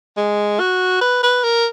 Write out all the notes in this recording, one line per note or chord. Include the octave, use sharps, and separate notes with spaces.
G#3
F#4
B4
B4
A#4